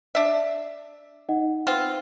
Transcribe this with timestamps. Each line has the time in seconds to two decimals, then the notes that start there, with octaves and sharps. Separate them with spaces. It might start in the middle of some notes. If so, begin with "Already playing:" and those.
0.15 D4 E5
1.29 D#4 D#5 F#5
1.67 B3 C4 F4